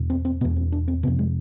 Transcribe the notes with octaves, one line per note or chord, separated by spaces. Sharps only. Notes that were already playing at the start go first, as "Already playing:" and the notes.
Already playing: E2 B2
C4
C4
E2 B2 B3
C4
D4
C4
F2 C3 B3
G#3